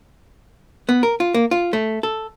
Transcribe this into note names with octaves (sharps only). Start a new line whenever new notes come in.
B3
A#4
F4
A#3
F4
A3
A4